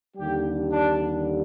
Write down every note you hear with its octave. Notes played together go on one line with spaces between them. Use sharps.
D#2 D3 G3 G4
D4